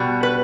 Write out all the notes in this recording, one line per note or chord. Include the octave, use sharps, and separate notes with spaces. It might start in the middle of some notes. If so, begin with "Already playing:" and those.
Already playing: B2 G3
B4